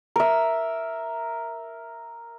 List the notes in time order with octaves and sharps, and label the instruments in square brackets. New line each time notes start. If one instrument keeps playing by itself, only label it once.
[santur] A#4 E5